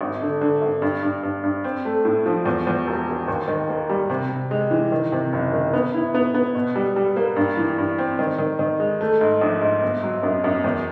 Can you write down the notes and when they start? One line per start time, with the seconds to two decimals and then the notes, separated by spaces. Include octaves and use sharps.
0.01 G#1
0.21 D3
0.41 D3
0.62 G#1
0.82 G2
1.03 G2
1.23 G2
1.43 G2
1.64 C4
1.85 A3
2.05 A2
2.26 F3
2.46 E2
2.67 E2
2.87 E1
3.08 E1
3.28 D#2
3.48 D#3
3.69 A#3
3.89 G3
4.10 C3
4.30 C3
4.51 G#3
4.71 E3
4.92 D#3
5.12 C3
5.33 F#1
5.53 D#3
5.73 B3
5.94 E4
6.14 B3
6.34 B3
6.55 B2
6.75 G3
6.96 G3
7.16 A#3
7.36 G2
7.57 E3
7.78 G2
7.98 C4
8.19 D#3
8.39 D#3
8.59 D#3
8.80 G#3
9.01 A3
9.21 G#2
9.41 A#1
9.61 G#2
9.82 G1
10.03 F#3
10.23 F#2
10.44 F#2
10.64 E2